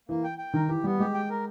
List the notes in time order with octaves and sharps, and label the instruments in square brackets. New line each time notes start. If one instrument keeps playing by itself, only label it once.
[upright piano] E3 [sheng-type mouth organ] A#3
[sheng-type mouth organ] G5
G5
[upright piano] D#3 [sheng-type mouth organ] A#4
[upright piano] E3 [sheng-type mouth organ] G4
[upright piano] G3 [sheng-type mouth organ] B3
[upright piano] G#3 [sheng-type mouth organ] G4
[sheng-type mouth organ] G5
A#4